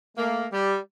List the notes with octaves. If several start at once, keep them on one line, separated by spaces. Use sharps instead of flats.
A3 A#3
G3